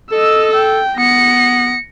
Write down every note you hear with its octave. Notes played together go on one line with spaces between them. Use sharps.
A4 D#5 E6
G5
B3 A#6 C#7